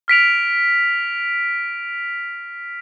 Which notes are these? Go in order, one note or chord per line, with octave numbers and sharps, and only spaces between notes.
F6 B6 D7 F7